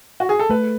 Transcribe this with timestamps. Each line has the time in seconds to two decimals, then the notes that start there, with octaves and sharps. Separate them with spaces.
0.20 F#4
0.29 G#4
0.39 A4
0.50 A3 B4